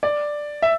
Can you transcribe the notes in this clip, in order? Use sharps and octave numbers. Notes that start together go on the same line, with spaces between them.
D5
E5